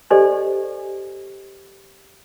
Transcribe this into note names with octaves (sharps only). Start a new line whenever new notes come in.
G4 A4 C5 D5 D#5 G#5